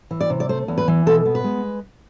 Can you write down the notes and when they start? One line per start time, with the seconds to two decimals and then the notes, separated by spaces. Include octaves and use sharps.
0.11 E3
0.21 D5
0.30 C3
0.40 D5
0.49 A3 C5
0.68 E2
0.78 B4
0.88 E3
1.06 B2 A4
1.25 B3
1.35 B4
1.44 G#3